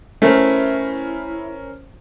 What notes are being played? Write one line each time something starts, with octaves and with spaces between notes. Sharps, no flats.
A3 C#4 E4 A#4 C5